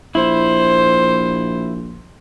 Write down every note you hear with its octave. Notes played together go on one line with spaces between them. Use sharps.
A#1 E4 C5